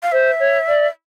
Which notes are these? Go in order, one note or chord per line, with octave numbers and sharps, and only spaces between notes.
F5
C5 E5
C#5
D5